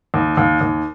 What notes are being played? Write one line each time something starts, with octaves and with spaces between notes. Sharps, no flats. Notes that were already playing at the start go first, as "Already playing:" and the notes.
D#2
D#2
D#2